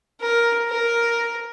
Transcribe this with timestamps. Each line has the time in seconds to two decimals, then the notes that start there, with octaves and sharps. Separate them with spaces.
0.21 A#4
0.68 A#4